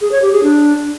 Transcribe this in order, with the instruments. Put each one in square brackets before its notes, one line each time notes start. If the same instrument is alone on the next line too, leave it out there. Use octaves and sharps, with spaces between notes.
[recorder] G#4
C#5
G4
G#4
D4